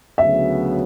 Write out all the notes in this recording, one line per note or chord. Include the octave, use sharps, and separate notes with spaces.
D2 C#3 F#3 B3 E5